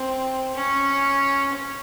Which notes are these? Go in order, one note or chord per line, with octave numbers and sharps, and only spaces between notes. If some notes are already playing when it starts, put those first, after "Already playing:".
Already playing: C4
C#4
C#4